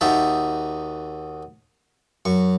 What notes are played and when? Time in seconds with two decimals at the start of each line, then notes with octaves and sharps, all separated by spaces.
0.01 D#2 D#4 F#4 E5 G5 A5
2.25 F#2 C#6